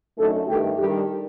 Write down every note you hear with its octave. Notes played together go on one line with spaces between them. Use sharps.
F#2 D3 A3 D#4 A4
G2 D#3 A3 D#4 G4
D#3 G3 D4 G4